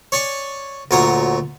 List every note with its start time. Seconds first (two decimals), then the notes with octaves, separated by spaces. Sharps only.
0.12 C#5 D5 G#5 C#6
0.91 D2 A#2 F#3 C#5 G#5 A#5